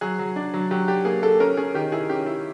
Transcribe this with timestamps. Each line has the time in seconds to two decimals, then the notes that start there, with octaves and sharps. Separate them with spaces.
0.01 F#3 G#4
0.19 F#3
0.36 D4
0.54 F#3
0.71 F#3 G4
0.88 D4 G4
1.05 A#3 G#4
1.22 A#3 A4
1.40 C#4 A#4
1.57 C#4 G#4
1.74 D#3 G4
1.92 E4 G#4
2.09 C#4 G4
2.26 E4